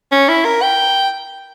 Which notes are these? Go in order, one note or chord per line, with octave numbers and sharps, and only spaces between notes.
C#4
E4
A#4
G5